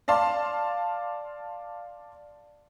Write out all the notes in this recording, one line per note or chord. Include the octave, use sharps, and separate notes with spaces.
D5 F5 A5 C6